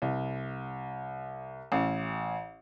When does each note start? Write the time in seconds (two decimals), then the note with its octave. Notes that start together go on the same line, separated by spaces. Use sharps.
0.02 C2
1.72 A1